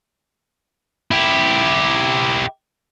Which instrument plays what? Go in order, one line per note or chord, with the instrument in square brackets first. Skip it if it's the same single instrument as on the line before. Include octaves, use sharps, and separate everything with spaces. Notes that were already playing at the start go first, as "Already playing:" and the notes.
[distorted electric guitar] E4 G4